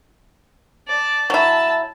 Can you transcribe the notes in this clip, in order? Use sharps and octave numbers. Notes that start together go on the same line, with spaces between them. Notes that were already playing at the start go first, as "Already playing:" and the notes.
D5 A5
F#3 E4 A5 E6